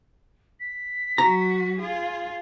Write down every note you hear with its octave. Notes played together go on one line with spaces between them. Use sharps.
B6
F#3 F#4 A#5
F4 G#4